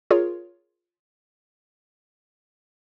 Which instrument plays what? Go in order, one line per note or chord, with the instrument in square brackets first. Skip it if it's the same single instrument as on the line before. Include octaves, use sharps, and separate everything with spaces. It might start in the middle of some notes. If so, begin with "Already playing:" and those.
[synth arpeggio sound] F4 G#4 A#4 C#5